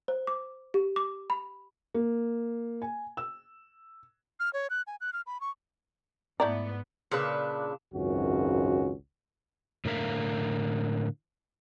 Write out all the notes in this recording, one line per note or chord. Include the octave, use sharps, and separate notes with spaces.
C5
D6
G4
D6
B5
A#3
G#5
E6
F6
C#5
F#6
G#5
F#6
F6
B5
C#6
G#2 A3 B3 E4 D5 A#5
A#2 C#3 D4 B4
G#1 C#2 F#2 C#4 F#4
A2 D3 A#4 E5 F5